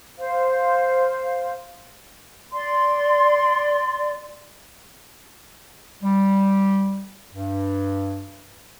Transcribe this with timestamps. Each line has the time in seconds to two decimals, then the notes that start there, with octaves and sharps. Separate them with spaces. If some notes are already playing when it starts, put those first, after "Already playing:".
0.18 C5 F5
2.53 D5 C6
6.03 G3
7.33 G2